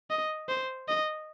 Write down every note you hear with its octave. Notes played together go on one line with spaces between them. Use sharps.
D#5
C5
D#5